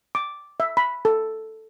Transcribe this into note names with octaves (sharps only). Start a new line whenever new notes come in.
D6
E5
B5
A4